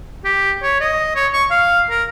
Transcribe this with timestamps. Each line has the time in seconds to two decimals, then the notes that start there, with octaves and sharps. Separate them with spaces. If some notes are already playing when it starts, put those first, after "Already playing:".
0.25 G4
0.63 C#5
0.81 D#5
1.16 C#5
1.33 C#6
1.50 F5
1.90 A#4